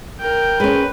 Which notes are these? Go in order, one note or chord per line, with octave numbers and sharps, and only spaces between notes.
A#4 G5
G#3 C#4 B4